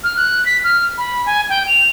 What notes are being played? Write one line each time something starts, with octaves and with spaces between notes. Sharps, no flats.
F6
F#6
B6
F6
B5
G#5
G5
F7